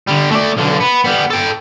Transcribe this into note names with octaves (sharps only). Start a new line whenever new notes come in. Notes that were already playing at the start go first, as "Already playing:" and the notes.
D3 G3
A3 D5
B1 D3
B3
G3 B3
A4 G5